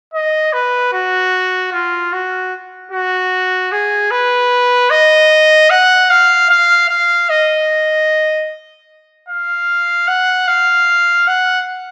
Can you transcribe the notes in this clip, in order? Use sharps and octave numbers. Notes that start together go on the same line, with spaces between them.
D#5
B4
F#4
F4
F#4
F#4
G#4
B4
D#5
F#5
F5
F5
F5
D#5
F5
F#5
F5
F#5